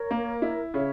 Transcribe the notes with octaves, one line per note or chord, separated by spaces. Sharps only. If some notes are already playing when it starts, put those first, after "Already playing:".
Already playing: A#4 C#5
A#3
E4
C#3 C#5 E5